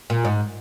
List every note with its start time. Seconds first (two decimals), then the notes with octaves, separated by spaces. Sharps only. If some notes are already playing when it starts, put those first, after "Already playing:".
0.10 A#2
0.25 G#2